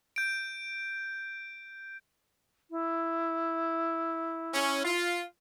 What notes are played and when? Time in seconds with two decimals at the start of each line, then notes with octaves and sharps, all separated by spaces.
0.16 G6 D7
2.70 E4
4.53 C#4
4.85 F4